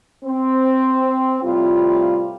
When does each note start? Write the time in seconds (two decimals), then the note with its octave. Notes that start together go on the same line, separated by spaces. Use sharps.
0.24 C4
1.43 A2 C3 G3 F4